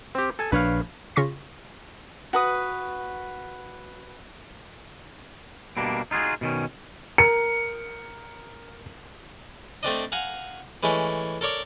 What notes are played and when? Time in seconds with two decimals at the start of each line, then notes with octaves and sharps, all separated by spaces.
0.15 C4 G4
0.39 A4 G#5
0.52 A#1 D4 B4 C#5 F5
1.16 C#3 F4 C6 C#6 A#6 B6
2.33 F#4 B4 D#6
5.77 B2 G3 A#3 D4
6.11 D#4 F4 F#4 G#4
6.41 B2 D#3 C#4
7.18 A#4 C#7
9.83 A3 C4 D4 D#5
10.12 F5 F#5 G#5 A#5
10.83 E3 G#3 A3 C#4
11.41 A4 A#4 C#5 D5